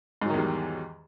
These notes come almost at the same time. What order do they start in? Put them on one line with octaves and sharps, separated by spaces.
G#2 F#3 D#3 E2 G3